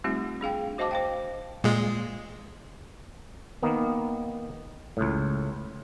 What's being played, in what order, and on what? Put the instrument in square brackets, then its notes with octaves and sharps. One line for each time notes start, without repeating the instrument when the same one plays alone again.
[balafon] G3 A3 C4 D#4 F4 G4
D4 G#4 F5 G5
F#4 C5 D#5 F5 A5 D6
C5 F5 G5
[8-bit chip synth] A#2 G#3
[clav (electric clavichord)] D#3 A#3 B3
C#2 A2